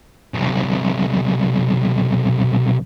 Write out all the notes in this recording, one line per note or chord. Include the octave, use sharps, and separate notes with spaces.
B1 C3